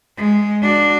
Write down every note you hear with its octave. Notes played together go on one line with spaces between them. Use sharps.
G#3
D4 F#4